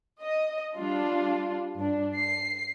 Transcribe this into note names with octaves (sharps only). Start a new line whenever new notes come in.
D#5
G3 D4 F4
G2 D4
C7